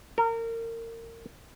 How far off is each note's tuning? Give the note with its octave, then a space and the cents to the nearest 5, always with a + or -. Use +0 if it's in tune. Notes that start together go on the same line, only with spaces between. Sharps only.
A#4 -30